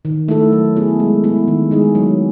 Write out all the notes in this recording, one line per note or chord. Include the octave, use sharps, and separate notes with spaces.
D#3
A3 E4 A4
F#3
B3 E4 G#4
G#3
B3 E4
D#3
G#3 D#4 G#4
F#3